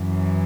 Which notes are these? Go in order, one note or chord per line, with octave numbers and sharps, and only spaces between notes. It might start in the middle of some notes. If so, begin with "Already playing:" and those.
Already playing: F#2 E3